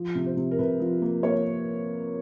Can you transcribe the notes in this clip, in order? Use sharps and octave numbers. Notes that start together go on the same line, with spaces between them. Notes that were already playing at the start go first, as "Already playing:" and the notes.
Already playing: F3
C3
C5
C3
A#4
C3 B4
F3
A#3
A#3 C#5